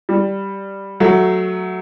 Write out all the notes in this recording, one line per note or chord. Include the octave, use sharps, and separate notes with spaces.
G3
F#3 A3